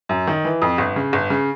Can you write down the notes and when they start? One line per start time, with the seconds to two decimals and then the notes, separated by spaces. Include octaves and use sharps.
0.09 F#2
0.27 D#3
0.45 E3
0.62 F2
0.78 G1
0.96 C#3
1.13 G1
1.30 C#3